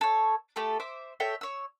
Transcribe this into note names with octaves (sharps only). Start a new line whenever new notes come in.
A4 C#5
A3 G4 A4
C5 E5 D6
A4 C#5 E5 G5
C#5 E6